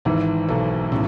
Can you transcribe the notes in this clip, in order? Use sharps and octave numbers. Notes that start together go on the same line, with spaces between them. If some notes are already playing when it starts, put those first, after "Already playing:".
G#1 G#2 E3
B1 B2 A4
A2 C#3